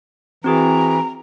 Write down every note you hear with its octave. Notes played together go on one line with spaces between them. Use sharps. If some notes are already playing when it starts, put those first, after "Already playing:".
E3 C4 F#4 G#4 A#5